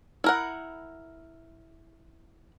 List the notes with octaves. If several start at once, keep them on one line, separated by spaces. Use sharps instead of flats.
E4 A#4 F#5